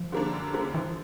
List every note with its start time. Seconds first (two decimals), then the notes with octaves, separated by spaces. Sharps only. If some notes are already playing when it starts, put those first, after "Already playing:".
Already playing: F3
0.12 D3 G3 A#3 D4
0.32 F#2
0.53 D3 G3 A#3 D4
0.74 E3 F3